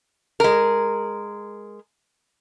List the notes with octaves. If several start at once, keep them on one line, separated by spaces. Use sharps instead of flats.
G#3 A#4